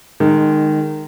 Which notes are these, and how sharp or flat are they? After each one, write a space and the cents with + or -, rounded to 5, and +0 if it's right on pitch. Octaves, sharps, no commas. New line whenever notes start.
D#3 -15 G#3 +0